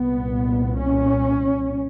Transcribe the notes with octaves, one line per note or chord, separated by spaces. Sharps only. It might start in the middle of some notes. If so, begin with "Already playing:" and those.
Already playing: C2 A#2 B3
C#4